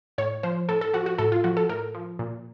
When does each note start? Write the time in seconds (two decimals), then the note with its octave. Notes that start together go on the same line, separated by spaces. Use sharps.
0.18 A2 C#5
0.43 F3 C5
0.69 A2 A4
0.81 A4
0.94 F3 F#4
1.06 F#4
1.18 A2 A4
1.32 F4
1.44 F3 F#4
1.57 A4
1.69 A2 A#4
1.95 F3
2.19 A#2